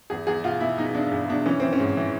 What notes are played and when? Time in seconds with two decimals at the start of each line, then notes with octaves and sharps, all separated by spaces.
0.10 E2 G#4
0.27 E2 G#4
0.44 B2 F4
0.60 B2 E4
0.78 B2 D#4
0.94 E2 D4
1.11 E2
1.29 B2 D4
1.46 E3 C#4
1.60 E3 C4
1.73 C#4
1.80 G#2
1.97 E3